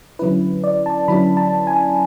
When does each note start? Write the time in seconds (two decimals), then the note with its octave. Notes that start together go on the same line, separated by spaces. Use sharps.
0.19 D3 F#3 C#4 E4 B4
0.64 D5
0.86 A5
1.08 D3 F#3 C#4 E4 B5
1.37 A5
1.67 G#5